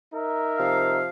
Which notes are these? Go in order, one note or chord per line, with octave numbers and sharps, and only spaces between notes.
D#4 A#4 E5
C3 F3 F5